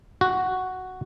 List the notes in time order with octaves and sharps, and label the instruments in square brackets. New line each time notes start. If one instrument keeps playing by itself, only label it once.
[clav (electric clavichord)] F#4